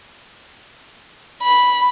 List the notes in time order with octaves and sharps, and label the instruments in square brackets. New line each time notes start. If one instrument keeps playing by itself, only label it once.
[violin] B5